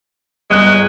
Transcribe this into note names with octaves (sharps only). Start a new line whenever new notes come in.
G1 G#3 F#6